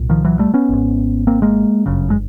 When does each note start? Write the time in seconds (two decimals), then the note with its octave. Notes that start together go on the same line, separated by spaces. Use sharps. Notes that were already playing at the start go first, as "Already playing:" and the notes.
Already playing: C2 A#2
0.09 D#3 F3
0.25 E3 F#3
0.39 G3 A3
0.54 B3 C#4
0.69 G#1 G#2
1.27 A#3 C4
1.42 G#3 A#3
1.86 G1 F#2 C#3
2.10 G#3